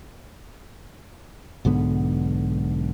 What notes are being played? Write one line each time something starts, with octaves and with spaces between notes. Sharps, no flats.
B1 G#2 D3 B3